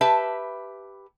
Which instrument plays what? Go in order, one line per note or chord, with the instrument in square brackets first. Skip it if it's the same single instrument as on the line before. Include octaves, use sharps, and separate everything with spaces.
[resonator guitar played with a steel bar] G4 B4 E5 A5